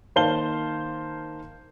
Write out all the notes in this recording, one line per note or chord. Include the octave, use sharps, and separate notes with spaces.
D#3 A#3 C5 F5 A5 G7